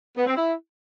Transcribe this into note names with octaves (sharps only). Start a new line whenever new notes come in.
B3
C4
E4